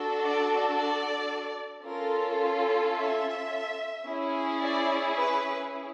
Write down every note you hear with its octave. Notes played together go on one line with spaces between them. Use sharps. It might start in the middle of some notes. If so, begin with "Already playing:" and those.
Already playing: D4 F#4 A4
D5
D5
C#4 F4 A4 A#4
E5
C#4 E4 G#4
D5
B4